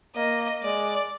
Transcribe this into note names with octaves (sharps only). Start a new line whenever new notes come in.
A#3 D#5
G#3 D5